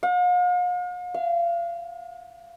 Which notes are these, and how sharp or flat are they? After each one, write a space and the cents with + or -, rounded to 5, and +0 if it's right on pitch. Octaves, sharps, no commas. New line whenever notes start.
F5 +45
F5 -30